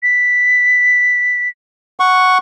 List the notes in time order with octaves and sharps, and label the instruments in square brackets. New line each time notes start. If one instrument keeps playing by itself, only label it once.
[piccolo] B6
[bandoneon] F#5 C#6